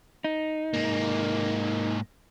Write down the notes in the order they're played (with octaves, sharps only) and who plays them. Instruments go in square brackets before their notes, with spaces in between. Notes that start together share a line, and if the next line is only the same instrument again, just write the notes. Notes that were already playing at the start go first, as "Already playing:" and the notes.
[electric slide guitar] D#4
[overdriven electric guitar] G#2 A#3